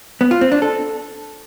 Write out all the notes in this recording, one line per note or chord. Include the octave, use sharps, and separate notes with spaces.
B3
F4
C4
D4
A4